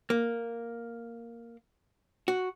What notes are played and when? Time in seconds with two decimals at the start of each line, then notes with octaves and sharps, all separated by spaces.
0.10 A#3
2.28 F#4